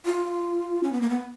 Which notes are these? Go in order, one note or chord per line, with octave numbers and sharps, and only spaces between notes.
F4
C#4
B3
A#3
B3